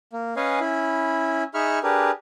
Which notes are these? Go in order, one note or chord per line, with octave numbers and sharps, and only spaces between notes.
A#3
C#4 B4 C#5 D#5 F5 G#5
C#4 E4 B5
D#4 G#4 E5 B5 C#6 F6
D4 G4 G#4 A#4 B4